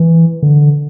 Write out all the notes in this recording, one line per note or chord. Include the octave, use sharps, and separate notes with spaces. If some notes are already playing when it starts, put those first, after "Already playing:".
Already playing: E3
D3